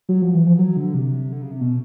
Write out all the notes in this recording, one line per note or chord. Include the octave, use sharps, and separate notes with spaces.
F#3
F3
E3
F3
F#3
D3
C3
D3
C#3
C3
B2